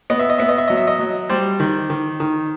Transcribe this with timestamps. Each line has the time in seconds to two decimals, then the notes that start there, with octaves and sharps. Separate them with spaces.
0.10 B3 D#5
0.19 E5
0.30 D#5
0.38 B3 E5
0.49 D#5
0.58 E5
0.68 F#3 D#5
0.77 E5
0.88 D#5
0.99 F#3
1.29 G3 C5
1.60 D#3
1.90 D#3
2.20 D#3